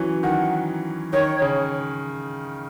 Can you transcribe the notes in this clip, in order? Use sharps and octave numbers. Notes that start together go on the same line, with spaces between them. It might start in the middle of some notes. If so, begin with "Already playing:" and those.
Already playing: E3 F#3 C#4
D#3 F#5
D#3 C#5
C#3